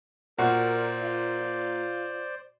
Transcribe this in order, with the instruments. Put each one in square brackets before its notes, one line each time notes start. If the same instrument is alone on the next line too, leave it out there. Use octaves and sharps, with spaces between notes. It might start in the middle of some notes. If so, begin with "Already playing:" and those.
[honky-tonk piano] A#2 [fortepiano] F#4 [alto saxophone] A#4 [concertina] C5 D5
[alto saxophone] F4
F4